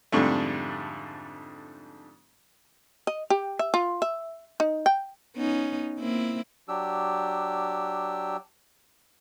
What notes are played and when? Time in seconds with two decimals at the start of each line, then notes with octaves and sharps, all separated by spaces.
0.12 F2 G#2 D3 G3 A3
3.07 D#5
3.30 G4
3.59 E5
3.74 F4
4.02 E5
4.60 D#4
4.86 G5
5.36 B3 C#4 D#4
6.00 A#3 C4 E4
6.68 F#3 D4 G4 E6